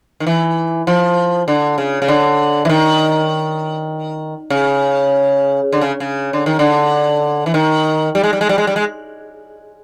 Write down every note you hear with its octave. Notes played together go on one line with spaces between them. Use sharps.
D#3
E3
F3
D3
C#3
C#3
D3
E3
D#3
C#3
D3
C#3
C#3
D3
D#3
D3
E3
D#3
G3
G#3
G3
G#3
G3
G#3
G3
G#3